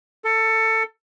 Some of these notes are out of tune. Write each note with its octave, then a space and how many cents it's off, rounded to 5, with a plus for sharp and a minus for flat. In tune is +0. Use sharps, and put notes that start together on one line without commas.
A4 +20